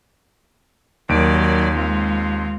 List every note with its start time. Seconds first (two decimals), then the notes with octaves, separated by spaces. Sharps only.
1.09 D#2 D#3 F#3 D5 D7
1.73 G#3 C4 F4